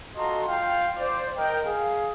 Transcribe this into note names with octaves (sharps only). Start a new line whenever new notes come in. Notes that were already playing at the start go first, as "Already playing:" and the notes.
F4 F#4 A4 D#5 A#5 C6
F4 F5 G5
C5 D5
A#4 D#5 G5
G#4 F5